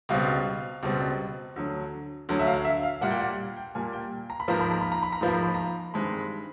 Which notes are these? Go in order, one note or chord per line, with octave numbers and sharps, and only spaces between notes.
C#2 B2 G3 C4 F5
C#2 B2 G3 C4
D2 D3 F#3
D2 D3 F#3
E5
F5
E5
F5
A#2 G3 A#3 F#5
G5
F#5
G5
A#2 G3 A#3 G#5
G5
A#5
B5
G#2 F3 A#3 A#5
B5
A#5
B5
A#5
B5
A#5
G#2 F3 A#3 B5
A#5
B5
A#5
G2 D#3 G#3 C4 B5